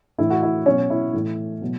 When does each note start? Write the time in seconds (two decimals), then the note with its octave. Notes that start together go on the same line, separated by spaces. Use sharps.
0.18 A2 E3 E4
0.30 F#4
0.43 E4
0.66 B2 F#3 C#4
0.90 E4
1.13 A2 E3
1.61 B2 F#3